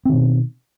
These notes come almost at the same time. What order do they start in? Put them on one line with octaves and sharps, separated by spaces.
C4 D#3 B2